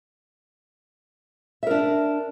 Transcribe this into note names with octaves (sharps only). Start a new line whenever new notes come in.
D4 A#4 E5